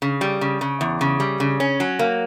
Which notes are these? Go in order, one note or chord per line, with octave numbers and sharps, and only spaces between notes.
C#3
G3
C#3
C#3
E2
C#3
G3
C#3
C#4
F#3
A#3